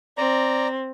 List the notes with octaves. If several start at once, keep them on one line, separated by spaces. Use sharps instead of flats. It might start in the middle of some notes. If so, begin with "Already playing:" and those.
C4 D5 A#5